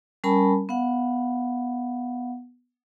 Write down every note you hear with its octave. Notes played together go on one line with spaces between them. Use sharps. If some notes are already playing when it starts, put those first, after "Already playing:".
G3 C#4 A#4 G#5 A5 B5
B3 F5 F#5